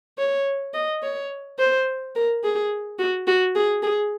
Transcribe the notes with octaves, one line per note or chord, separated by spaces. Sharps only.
C#5
D#5
C#5
C5
A#4
G#4
F#4
F#4
G#4
G#4